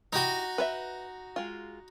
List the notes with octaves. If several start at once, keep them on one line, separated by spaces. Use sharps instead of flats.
D#4 E4 F#4 G4
B4 C5 E5
G#3 F4